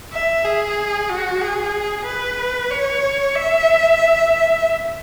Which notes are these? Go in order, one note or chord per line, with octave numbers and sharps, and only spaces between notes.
E5
G#4
F#4
G#4
B4
C#5
E5